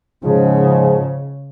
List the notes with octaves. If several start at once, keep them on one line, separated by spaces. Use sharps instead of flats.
G#2 C#3 F3 G#3